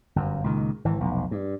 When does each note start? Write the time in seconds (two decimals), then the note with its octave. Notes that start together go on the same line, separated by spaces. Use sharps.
0.16 G1 F#2
0.44 C#2 A#2 D#3
0.85 G#1 E3
1.00 F1 B1
1.31 G2